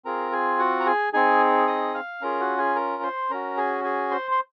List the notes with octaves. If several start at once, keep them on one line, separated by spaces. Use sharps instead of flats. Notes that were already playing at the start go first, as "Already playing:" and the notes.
C4 F4 G#4 A#4 A#5
G#4 G#5
F#4 F#5
A#5
G#4 G#5
C4 D#4 G#4 G#5
D#5 D#6
F5 F6
C#4 F4 G#4 A#4 A#5
F#4 F#5
G#4 G#5
A#4 A#5
C5 C6
C#4 F#4 A#4 A#5
G#4 G#5
G#4 G#5
C5 C6
C6